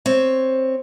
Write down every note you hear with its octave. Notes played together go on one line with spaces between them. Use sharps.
C4 C#5